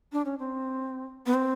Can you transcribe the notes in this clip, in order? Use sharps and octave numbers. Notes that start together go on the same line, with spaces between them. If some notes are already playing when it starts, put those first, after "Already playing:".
D4
C#4
C4
B3
C4